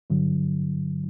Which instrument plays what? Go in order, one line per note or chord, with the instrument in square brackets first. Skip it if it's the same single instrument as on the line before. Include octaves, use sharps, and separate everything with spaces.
[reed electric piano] G2 D3 F#3